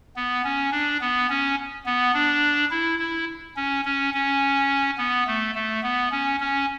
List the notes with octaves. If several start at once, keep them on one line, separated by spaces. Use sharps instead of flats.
B3
C#4
D4
B3
C#4
B3
D4
E4
E4
C#4
C#4
C#4
B3
A3
A3
B3
C#4
C#4